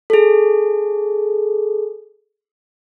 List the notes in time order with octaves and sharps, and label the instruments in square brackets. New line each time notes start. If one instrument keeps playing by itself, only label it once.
[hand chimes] G#4 A4